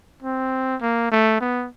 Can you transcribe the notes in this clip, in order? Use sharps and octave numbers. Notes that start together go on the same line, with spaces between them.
C4
A#3
A3
B3